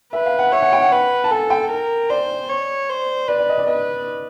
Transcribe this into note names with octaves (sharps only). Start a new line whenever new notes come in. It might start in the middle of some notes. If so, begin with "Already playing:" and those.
B4 E5
F5
F#5
C#5 E5
F#5
G5
F#5
B4
A5
A4 G#5
G5
A#4
C5 D5
C#5
C5
B4 D5
D5
D#5
D5
B4 D#5